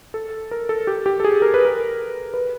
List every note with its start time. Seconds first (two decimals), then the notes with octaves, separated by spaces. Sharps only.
0.14 A4
0.51 A#4
0.69 A4
0.87 G4
1.06 G4
1.20 A4
1.24 G#4
1.42 A#4
1.54 B4
1.65 A#4
2.34 B4